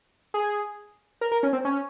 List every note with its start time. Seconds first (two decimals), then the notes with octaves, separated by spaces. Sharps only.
0.34 G#4
1.21 A#4
1.32 A#4
1.43 C#4
1.53 C4
1.65 C#4